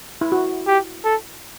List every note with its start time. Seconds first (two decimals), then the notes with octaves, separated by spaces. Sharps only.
0.21 E4
0.32 F#4
0.67 G4
1.04 A4